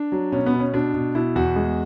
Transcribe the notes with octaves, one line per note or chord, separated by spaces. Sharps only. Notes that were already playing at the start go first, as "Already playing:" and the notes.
Already playing: D4
F#3
B2 C#4
B3
B2
C#4
B2 D4
B2
B2 E4
E2 F#4
G#3